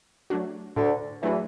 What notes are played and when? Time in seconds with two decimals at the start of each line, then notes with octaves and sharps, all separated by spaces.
0.30 F#3 A3 D4 F#4
0.76 D2 A2 D3
1.22 E2 E3 F#3 A3 D4 F#4